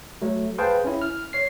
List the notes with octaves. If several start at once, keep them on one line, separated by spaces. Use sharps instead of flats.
F#3 A3
G#4 B4 C5 F5 G5 A5
C#4 E4
F6
C#5 C7